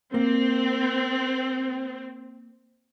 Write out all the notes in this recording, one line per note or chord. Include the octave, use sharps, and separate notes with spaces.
A#3 C4